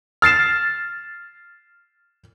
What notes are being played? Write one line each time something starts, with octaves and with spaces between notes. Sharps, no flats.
F6 A6 C7 E7